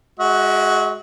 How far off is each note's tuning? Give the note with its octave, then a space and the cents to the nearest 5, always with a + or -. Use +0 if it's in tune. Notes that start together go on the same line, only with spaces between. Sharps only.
G#3 +0 F#4 +0 E5 -40